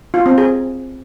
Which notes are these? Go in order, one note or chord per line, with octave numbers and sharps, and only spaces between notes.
F4
C4
G#4